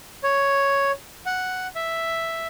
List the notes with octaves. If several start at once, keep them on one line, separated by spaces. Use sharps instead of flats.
C#5
F#5
E5